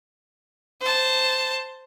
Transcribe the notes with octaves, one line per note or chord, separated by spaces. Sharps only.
C5 A5